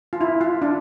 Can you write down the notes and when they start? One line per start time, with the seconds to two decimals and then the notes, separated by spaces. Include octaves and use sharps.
0.13 F4
0.21 E4
0.41 F4
0.62 D4